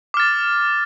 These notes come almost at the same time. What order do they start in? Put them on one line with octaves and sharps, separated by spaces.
D6 F6 A6